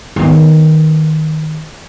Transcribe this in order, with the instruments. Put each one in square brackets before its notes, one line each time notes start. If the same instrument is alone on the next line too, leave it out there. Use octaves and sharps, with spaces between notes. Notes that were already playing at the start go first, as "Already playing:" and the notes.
[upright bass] D#3 B3